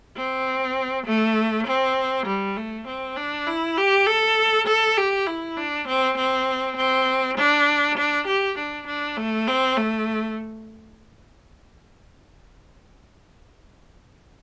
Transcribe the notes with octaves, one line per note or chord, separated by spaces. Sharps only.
C4
A3
C4
G3
A3
C4
D4
E4
G4
A4
A4
G4
E4
D4
C4
C4
C4
D4
D4
G4
D4
D4
A3
C4
A3